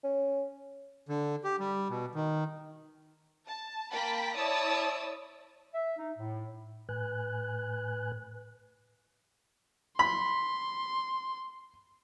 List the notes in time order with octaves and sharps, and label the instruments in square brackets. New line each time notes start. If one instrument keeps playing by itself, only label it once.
[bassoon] C#4
[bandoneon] D3
G4
G3
B2
D#3
[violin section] A5
A#3 G5 A5 B5 B6
E4 C#5 D5 A5 D#6 E6
[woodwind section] E5
D#4
A2
[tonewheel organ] A2 B4 G#5 F#6
[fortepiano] B5 [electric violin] C6